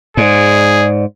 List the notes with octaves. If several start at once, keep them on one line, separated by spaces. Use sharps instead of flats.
G#2 G#4 D5